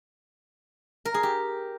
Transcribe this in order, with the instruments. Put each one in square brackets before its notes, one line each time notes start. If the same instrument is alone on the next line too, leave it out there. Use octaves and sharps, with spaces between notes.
[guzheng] A#4
G#4
G4